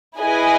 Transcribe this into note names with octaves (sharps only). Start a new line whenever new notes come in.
E4 G#4 B4 D#5 G#5